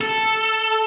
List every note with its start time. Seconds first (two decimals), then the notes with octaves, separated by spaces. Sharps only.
0.01 A4